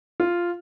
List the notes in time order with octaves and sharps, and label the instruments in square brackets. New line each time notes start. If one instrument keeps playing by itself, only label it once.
[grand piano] F4